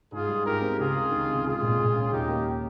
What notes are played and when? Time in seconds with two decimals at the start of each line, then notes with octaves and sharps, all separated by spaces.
0.12 G#2 F4 G#4
0.28 G3
0.45 G#2 G4 A#4
0.62 C4
0.78 C#2 F4 G#4
0.95 C#2
1.11 D#3
1.28 C3
1.44 G#3 F4 G#4
1.62 A#2
1.78 A#2
1.95 C#4
2.11 D#2 D#4 G4
2.28 A#3